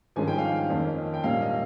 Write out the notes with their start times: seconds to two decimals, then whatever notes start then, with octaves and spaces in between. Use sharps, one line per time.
0.16 G#1 G2 F3 G#3 C#4 G#5
0.27 G5
0.38 F5
0.50 G5
0.70 F2 D#3 A#3 C#4
1.14 G5
1.23 A#1 G#2 G3 A#3 C#4 F5
1.41 D#5